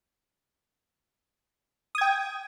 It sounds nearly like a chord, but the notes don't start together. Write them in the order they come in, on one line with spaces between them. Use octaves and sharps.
D#6 G#6 G5